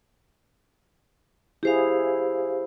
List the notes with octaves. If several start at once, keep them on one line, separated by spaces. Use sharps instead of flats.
E4 G4 G#4 C5 F5